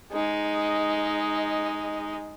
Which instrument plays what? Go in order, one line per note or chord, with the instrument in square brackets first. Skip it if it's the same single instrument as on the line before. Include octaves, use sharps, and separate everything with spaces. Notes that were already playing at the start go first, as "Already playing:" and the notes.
[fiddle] G#3 D#4